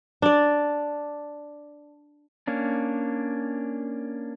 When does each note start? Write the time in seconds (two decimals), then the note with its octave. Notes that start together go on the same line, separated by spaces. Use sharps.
0.22 D4 D5
2.47 A#3 C#4 D4